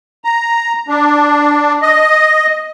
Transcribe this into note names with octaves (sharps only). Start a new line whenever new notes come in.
A#5
D4
D#5